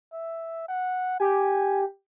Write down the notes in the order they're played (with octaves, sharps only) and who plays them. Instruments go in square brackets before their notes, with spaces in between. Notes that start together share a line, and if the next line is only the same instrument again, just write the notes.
[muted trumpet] E5
F#5
[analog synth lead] G4 [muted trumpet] G#5